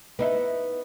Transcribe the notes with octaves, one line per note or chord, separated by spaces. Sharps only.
B3 D#4 E4